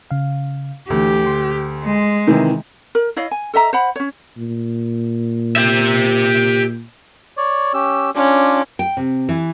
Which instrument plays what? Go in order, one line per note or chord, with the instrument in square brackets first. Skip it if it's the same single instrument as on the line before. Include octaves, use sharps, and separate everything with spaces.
[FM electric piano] C#3 F5
[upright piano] D2 [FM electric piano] D3 E3 [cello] G4
[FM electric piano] C6
[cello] G#3
[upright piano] C3 D#3 E3
[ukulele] A#4
E4 C#5 D#5 F5
G#5
A4 D#5 E5 A#5
C5 F#5 B5
C#4 C#5
[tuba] A#2
[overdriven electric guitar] G4 E5
[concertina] C#5 D5
C#4 G4 E6
[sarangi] C#4 [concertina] D4 F4 D6
[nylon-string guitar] G5
C3
E3